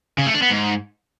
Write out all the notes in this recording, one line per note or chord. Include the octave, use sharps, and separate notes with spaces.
C#3
A3
D4
B3
G#2